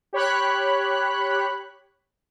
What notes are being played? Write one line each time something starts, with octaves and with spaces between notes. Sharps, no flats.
G4 C#5 B5 F#6